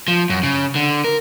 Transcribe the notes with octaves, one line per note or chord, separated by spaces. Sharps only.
F3
F#2
C#3
D3
A#4